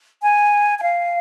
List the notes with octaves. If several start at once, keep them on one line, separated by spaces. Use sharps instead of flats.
G#5
G#5
F5